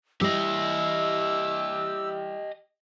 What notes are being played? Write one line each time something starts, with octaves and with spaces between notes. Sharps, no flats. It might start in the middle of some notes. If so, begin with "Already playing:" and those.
G3 E4 G4 D#5 E6